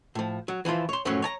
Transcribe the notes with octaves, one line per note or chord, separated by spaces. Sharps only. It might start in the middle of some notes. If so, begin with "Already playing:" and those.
A2 F3
F#3
E3 F3 E4 F4
C#5 C6
F#2 A2 F3 F#3 C#4
C#5 G#5 A#5